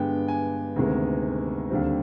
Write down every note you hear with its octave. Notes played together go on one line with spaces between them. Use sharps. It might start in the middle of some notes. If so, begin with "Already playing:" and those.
Already playing: G2 D3 G#3 B3 G5
G#5
D2 C3 D#3 G#3 B3
D#2 D3 G3 C4